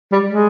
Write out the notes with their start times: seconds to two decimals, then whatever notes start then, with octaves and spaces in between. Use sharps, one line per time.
0.12 G3
0.30 G#3